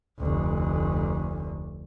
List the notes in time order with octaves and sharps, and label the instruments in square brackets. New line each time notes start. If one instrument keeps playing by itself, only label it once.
[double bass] F1 D2